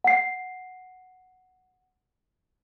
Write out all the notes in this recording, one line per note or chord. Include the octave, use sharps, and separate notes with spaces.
F#5 C7